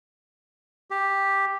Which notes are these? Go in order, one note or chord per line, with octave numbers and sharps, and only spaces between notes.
G4